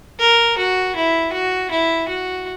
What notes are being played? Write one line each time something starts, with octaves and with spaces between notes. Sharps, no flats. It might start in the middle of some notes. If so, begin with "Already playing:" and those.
A#4
F#4
E4
F#4
E4
F#4